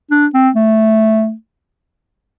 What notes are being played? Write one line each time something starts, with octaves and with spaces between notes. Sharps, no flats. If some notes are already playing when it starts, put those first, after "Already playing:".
D4
C4
A3